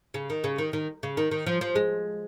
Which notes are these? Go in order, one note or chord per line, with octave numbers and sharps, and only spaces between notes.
C#3
D#3
C#3
D#3
D#3
C#3
D#3
D#3
F3
F3
G#3